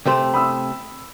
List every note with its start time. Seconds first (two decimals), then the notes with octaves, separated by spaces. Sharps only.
0.06 C3 A3 C5
0.34 B5 D#6 E6